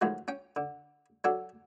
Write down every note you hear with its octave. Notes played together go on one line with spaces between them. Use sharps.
A2 D#3 F3 F#3 G#3
C#4 G5
D3
F#3 D4 F#4 A4